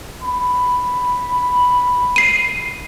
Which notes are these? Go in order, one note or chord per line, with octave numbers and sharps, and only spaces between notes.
B5
C7 D#7